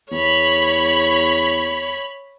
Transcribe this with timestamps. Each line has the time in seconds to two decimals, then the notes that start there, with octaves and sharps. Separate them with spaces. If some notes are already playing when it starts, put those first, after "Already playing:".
0.11 E2 C#5 B5